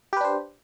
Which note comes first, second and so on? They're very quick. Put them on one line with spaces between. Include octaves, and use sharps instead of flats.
G4 B4 D4 C5